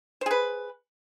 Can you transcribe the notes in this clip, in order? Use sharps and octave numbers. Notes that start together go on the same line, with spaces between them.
G#4 B4 C5